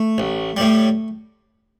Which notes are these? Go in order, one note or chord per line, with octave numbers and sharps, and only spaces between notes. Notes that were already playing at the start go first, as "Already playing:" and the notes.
Already playing: A3
A1
A2 G3